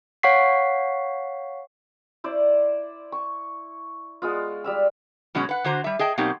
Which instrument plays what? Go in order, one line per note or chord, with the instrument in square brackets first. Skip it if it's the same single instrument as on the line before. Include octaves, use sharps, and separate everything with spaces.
[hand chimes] C#5 F5 F#5 C#6 B6 C7
[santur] E4 C5 D5
C#6
G#3 B3 F4
G3 F5 E6
[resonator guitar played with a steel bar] B2 F#3 G#3 C#4
B4 F#5
D3 D4 F#4 C5 A#5
G3 E5
G#4 D#5 G5 A5
B2 F#3 A#3 C4 D#4 G4